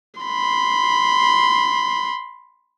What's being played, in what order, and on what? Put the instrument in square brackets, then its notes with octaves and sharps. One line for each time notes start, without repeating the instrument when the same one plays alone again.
[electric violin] B5 C6